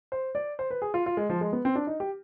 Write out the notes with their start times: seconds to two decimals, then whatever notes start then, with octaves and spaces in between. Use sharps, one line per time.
0.12 C5
0.35 D5
0.59 C5
0.71 B4
0.82 G#4
0.94 F4
1.06 F4
1.17 G#3
1.29 F3
1.41 G#3
1.53 B3
1.65 C4
1.75 D4
1.87 D#4
2.00 G4